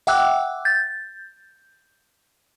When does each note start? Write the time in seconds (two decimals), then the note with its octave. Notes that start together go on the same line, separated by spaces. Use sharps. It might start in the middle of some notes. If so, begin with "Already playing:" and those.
0.07 E5 F#5 G5 D6 E6 F#6
0.65 G6 A6